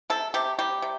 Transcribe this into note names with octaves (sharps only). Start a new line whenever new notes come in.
C3 A4
C3 G4
G3 G4
C3